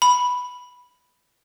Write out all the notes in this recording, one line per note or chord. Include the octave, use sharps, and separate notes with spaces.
B5